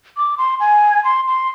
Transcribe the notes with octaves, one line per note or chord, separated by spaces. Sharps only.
D6
C6
G#5
C6
C6